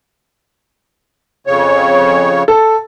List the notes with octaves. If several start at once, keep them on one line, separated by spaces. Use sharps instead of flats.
F2 C#3 C#5
A4